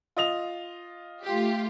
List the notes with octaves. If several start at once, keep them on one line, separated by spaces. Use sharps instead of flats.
F4 D#5 F7
A3 F4 G4